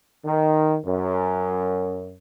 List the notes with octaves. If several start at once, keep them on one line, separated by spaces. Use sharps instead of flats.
D#3
F#2